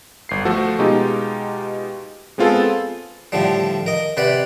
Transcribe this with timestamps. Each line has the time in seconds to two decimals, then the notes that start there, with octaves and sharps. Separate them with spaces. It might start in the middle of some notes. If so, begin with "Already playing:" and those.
0.29 G1 C7
0.45 F3 A3 F#4 A4
0.79 B2 G#3 D#4 F4 G4
2.38 G#3 B3 C4 F4 G#4 A4
3.32 A2 D3 F3 G3
3.86 A#4 D#5
4.17 C3 B4 D5 F#5